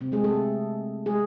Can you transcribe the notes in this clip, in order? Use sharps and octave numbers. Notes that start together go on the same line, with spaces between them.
C3 C4
G#3 G#4
A3 A4
G#3 G#4